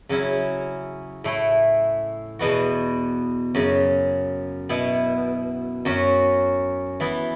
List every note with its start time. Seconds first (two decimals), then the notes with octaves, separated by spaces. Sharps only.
0.09 C#3 F#3 C#4 E4
1.24 A2 A3 E4
2.39 E2 B2 B3 F#4
3.55 F#2 C#3 F#3
4.69 B2 B3 E4
5.85 F#2 F#3 C#4 F#4
7.00 E3 B3 E4